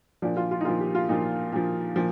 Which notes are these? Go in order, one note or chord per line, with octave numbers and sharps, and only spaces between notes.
A#2 F3 D4
F4
F4
D#4
A#2 F3 F4
G4
F4
A#2 F3 D#4
A#2 F3
A#2 F3